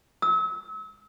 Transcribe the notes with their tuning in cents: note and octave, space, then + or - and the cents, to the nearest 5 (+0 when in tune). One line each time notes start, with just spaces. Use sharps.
E6 -40